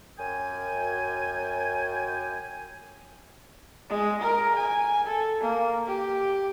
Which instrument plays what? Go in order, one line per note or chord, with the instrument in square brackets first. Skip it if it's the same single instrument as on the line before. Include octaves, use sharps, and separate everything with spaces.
[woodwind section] F#2 G5 G#5
[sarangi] G#3
A#4
G#5
A4
A#3
G4